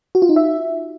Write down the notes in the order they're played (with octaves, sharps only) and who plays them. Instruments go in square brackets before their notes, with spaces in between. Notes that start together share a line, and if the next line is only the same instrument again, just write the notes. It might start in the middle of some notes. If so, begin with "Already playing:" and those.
[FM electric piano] F#4
F4
D#4
E5